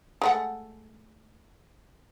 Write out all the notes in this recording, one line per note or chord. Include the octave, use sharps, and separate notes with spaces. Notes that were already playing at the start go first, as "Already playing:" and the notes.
G#3 A3 F#5